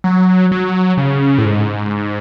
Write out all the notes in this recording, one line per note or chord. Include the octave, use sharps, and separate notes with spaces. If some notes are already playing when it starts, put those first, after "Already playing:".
F#3
F#3
C#3
A2
G#2